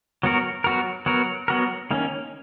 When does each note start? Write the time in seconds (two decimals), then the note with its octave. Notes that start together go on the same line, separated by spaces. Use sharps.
0.23 F#3 B3 F#4 A#4
0.64 F#3 B3 F#4 A#4
1.06 F#3 B3 F#4 A#4
1.48 F#3 B3 F#4 A#4
1.91 D#3 A#3 C#4